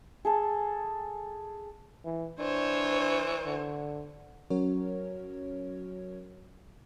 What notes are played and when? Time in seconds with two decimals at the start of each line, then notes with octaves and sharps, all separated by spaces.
0.25 G#4 A4 A5
2.05 E3
2.39 E3 D4 C5 C#5
3.46 D3
4.50 F#3 C#4 F#4 A#4 C#5